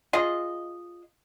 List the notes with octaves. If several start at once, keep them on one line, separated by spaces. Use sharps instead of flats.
F4 G#4 D#5